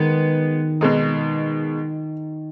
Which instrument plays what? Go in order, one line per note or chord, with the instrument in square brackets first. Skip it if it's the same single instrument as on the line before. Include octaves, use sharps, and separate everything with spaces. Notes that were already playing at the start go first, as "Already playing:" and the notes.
Already playing: [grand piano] D#3 [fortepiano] G#3 B3
[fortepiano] B2 G#3 D#4